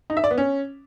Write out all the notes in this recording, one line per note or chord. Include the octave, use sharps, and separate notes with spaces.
D#4
E5
D5
B3
C#4